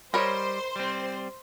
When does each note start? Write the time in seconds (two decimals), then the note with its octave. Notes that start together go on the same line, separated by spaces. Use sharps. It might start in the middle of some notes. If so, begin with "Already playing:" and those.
0.14 G3 A#4 C5 C#5 D#5 B5
0.76 G3 C4